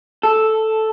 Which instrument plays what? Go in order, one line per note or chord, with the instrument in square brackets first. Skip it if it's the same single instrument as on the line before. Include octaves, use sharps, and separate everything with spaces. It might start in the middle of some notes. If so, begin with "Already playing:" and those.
[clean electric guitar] A4